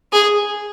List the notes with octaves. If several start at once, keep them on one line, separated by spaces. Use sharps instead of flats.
G#4